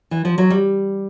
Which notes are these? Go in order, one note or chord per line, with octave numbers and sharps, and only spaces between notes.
E3
F3
F#3
G3